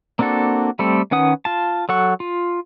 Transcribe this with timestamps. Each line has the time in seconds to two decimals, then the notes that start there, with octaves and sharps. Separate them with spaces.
0.19 A#3 C4 D4 F#4 A4
0.79 G3 A3 C4 A4
1.11 D#3 C#4 B4 F#5 D#6
1.45 F4 A5
1.89 F#3 A4 F#5 C#6
2.20 F4